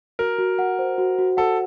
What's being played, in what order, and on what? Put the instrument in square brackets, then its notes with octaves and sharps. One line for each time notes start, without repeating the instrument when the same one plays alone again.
[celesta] F#4 [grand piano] A#4
[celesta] F#4
F#5
C5
F#4
F#4
[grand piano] A4 [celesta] F#5